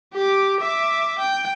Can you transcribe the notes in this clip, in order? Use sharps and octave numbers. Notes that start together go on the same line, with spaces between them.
G4 D6
E5 D6
G5